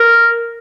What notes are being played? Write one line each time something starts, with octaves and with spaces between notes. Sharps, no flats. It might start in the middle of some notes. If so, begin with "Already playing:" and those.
Already playing: A#4